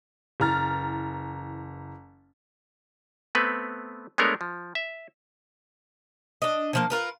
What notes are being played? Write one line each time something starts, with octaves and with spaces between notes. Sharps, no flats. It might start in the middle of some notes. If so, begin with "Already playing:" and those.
F#1 E3 A#5 F6 A6
A3 B3 C4 B4
G#3 A3 B3 D4 A#4 C#5
F3
E5
D4 D#5
D3 F3 A#3
F4 A#4 B4